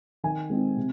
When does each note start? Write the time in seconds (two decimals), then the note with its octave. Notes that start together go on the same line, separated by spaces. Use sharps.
0.24 D#3 G#5
0.50 G#3 C4 D#4
0.77 C3